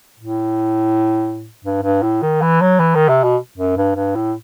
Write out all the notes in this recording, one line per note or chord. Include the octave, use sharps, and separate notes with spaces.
A2
G2
G2
A2
D#3
E3
F#3
E3
D#3
C3
B2
F#2
G2
G2
A2